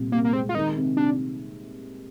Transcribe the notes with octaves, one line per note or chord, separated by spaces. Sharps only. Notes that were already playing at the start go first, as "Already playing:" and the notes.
Already playing: C2 A#2 G3
C2 A#3
A#3
G#3 C4
F4
D#3 D#4
C3
C3 D4